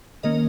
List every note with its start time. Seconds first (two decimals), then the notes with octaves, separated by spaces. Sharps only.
0.23 D#3 A#3 C#4 A#4 D#5